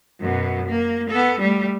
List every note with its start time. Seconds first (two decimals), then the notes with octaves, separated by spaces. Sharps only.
0.20 F#2 B2
0.68 A#3
1.10 B3 A4
1.40 G3 A3